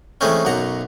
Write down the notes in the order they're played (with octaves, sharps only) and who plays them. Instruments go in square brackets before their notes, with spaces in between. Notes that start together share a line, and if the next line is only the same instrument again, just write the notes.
[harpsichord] E3 G#3 A3 C4 C#4
B1 F#2 F#5 A#5